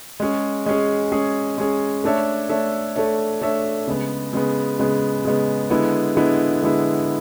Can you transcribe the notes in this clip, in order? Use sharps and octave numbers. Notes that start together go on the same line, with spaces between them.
G#3 C#4 G#4
G#3 C#4 G#4
G#3 C#4 G#4
G#3 C#4 G#4
A3 D4 A4 C#5 E5
A3 D4 A4 C#5 E5
A3 D4 A4 C#5 E5
A3 D4 A4 C#5 E5
C#3 G#3 B3
C#3 G#3 B3
C#3 G#3 B3
C#3 G#3 B3
D3 G#3 B3 E4
D3 G#3 B3 E4
D3 G#3 B3 E4